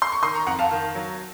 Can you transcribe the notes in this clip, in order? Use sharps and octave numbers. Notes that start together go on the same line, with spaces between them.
C6
C#6
D#3 C6 D#6
A#5 C#6
F2 F#5 A#5
F5 A5
D#3
F#3